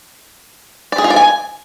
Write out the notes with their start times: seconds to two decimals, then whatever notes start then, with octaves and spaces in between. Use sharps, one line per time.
0.92 D5
0.98 G#4
1.04 F4
1.10 D5
1.16 G#5